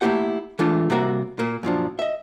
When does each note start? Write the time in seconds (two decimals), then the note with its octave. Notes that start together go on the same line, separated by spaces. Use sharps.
0.01 A3 A#3 E4 F4 G4 F#5
0.59 E3 G#3 A3 D4 F4
0.90 C3 G3 A#3 F#4 A#4 E5
1.39 A#2 A#3
1.63 F#2 A#2 F3 D4
1.99 D#5 E5